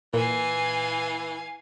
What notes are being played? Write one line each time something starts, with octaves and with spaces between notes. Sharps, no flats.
A#2 E3 F5 G#5